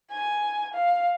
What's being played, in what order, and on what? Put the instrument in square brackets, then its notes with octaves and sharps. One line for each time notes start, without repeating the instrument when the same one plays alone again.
[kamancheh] G#5
F5